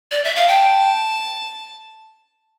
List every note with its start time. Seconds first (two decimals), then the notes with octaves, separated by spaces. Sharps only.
0.11 D5
0.24 E5
0.36 F5
0.48 G5 A5